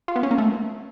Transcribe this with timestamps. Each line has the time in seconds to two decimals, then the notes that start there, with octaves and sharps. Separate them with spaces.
0.08 F4
0.16 B3
0.23 C#4
0.31 A#3
0.38 A3